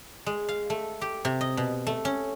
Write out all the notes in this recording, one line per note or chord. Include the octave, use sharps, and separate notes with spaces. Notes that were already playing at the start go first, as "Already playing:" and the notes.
G#3
F5
A3
G4
C3
D#5
B2
A3
C#4